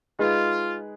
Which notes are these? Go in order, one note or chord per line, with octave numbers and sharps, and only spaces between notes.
G#3 D#4 F4 G#4 B4